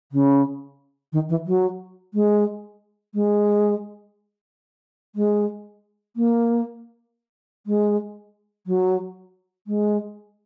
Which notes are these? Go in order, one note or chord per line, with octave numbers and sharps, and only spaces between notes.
C#3
D#3
E3
F#3
G#3
G#3
G#3
A#3
G#3
F#3
G#3